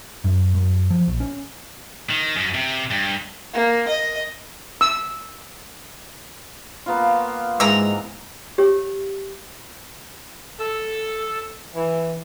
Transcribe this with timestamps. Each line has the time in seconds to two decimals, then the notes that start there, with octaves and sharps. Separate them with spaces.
0.24 F#2
0.55 F#2
0.90 F3
1.07 A#1
1.20 C#4
2.10 D#3
2.36 F#2
2.54 C3
2.91 G2
3.54 A#3
3.88 D#5
4.81 E6
6.86 A#3 B3 F4
7.60 G#2 E3 G#3 A#5 E6
8.58 G4 C#5
10.60 A4
11.75 E3